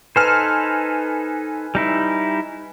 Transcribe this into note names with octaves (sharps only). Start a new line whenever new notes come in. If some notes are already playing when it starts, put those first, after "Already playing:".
D#4 A4 B4 C5 G#5 F6
G3 D#4 E4